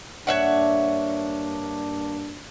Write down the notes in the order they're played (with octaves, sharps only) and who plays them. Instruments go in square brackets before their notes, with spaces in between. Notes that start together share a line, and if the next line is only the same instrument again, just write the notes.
[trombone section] G2 A#3 D4 [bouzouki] C#5 E5 F#5